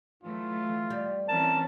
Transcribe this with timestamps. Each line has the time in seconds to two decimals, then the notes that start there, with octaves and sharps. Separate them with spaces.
0.23 E3 F#3 A3 F4
0.90 G3
1.29 E3 C4 C#4 A#4 A5